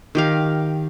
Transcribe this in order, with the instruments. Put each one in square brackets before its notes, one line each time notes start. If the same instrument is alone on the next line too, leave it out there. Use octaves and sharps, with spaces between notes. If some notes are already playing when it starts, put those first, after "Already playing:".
[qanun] D#3 G4 F5